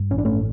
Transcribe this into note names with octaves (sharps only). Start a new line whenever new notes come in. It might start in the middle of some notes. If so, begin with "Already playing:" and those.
Already playing: G2
A1 C#4
D4
A3 C#4